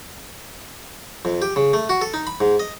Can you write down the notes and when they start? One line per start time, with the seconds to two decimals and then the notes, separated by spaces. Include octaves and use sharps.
1.25 F2
1.42 G4
1.56 C#3
1.73 A3
1.89 F#4
2.01 A4
2.14 D#4
2.27 B5
2.41 G#2
2.60 D#5